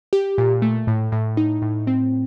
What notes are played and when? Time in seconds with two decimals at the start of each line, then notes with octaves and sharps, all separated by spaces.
0.13 G4
0.38 A#2
0.62 A3
0.87 A2
1.12 A2
1.37 D#4
1.62 A2
1.87 C4